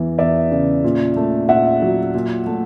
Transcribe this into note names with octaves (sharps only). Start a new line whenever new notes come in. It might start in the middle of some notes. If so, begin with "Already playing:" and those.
Already playing: E2 E3
E2 D5 E5
C#3
A#2
A3
A#2 E5 F#5
F#3
A#2
A3